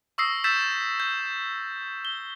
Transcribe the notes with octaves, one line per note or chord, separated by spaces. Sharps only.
C#6 D#6 E6 A#6 C7
E6 G6 A6 B6 E7
G6
G7